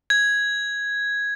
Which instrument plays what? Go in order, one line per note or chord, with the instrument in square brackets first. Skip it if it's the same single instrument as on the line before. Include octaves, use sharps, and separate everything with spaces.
[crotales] G#6